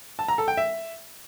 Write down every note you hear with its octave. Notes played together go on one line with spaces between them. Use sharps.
A5
A#5
A4
G5
E5